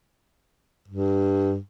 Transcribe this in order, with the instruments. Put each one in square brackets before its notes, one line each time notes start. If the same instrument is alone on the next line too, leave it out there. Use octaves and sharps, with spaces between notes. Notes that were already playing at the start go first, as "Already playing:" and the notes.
[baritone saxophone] G2